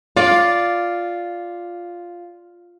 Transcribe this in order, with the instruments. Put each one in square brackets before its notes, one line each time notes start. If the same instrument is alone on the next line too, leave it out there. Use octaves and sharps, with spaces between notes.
[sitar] F4 [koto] D5